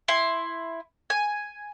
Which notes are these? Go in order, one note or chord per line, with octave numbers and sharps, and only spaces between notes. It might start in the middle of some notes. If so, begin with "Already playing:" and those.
E4 C6
G#5